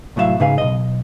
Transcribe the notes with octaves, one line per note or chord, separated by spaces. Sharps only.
C2 A2 F#3 D4 E5 F5
G#2 C#3 D#4 G#4 B4 F5
B1 D#5